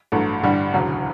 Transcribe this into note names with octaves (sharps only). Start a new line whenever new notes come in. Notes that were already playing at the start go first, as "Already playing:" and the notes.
A1 G2 F#3 A3
A1 G2 D3 G3
E1 D2 C#3 F#3